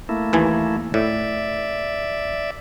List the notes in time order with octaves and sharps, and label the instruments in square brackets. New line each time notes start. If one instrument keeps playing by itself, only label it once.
[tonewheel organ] A3 A#3 E4
[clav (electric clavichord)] D#2 E3 G#5
[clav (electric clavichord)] A2 [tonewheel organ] D5 E5